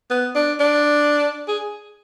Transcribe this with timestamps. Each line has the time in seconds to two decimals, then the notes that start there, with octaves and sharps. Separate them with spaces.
0.10 B3
0.35 D4
0.60 D4
1.48 G#4